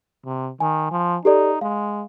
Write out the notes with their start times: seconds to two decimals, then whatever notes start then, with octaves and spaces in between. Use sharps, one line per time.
0.25 C3
0.60 D#3 G#5
0.91 F3
1.25 D#4 G4 A4 D5
1.61 G#3 F5